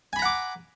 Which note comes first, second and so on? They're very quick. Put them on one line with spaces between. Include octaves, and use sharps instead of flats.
G#5 B5 A#5 F#5 D6